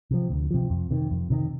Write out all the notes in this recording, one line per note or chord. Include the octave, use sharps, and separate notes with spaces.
C3 F3
D2
C3 F3
F2
C3 D#3
F2
C3 D#3